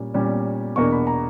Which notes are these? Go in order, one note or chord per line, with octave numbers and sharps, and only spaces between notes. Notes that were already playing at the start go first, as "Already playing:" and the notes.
Already playing: A#2 G3 C#4
A#2 G3 C#4
E2 B2 A#3 D4 C#6
B5
A#5